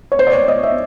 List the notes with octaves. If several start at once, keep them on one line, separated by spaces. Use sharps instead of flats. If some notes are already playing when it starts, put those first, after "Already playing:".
C#5
C5
D5
C#5
D#5
E5